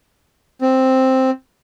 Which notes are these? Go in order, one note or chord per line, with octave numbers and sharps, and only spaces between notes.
C4